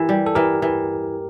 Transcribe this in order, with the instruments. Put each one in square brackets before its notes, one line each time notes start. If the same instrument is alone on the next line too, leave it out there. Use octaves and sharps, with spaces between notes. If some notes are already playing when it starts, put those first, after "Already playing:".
Already playing: [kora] E3 [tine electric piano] G4 A#4
[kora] G3
[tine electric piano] A4
[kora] E3 [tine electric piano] G4 A#4
[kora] E3